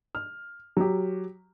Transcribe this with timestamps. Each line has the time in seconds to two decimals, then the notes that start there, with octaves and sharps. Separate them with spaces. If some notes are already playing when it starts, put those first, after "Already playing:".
0.15 F6
0.77 F#3 G4